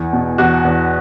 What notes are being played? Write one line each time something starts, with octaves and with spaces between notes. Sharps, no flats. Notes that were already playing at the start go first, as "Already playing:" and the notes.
Already playing: E2
B2
E2 F#4
E2